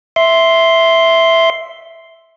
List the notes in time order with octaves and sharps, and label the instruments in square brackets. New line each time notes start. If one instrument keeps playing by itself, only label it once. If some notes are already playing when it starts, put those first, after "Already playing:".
[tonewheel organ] E5 C6